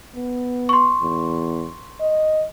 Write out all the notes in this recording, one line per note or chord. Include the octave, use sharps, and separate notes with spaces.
B3
C6 C#6
E2
D#5